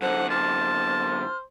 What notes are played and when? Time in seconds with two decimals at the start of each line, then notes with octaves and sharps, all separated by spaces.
0.02 F#2 D3 A4 C5 F#5
0.30 C5 A5 F6